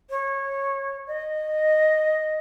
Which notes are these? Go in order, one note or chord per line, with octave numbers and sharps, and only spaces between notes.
C#5
D#5